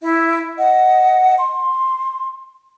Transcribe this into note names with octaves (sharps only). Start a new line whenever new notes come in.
E4 E5
D#5 F#5
C6